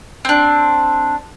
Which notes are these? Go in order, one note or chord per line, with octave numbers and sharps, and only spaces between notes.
C4 D4